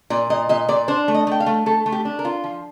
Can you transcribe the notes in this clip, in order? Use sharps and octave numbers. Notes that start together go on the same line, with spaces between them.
A#2 D5
A#2 D#5
A#2 D#5
A#2 D5
D4 C5
A3
D#5
A3 G5
F5
A3
A3 A4
A3
G4
D4
A#4
F4
F3